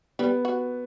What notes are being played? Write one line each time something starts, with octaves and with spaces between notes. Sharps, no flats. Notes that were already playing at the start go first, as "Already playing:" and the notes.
G3 B3
F#4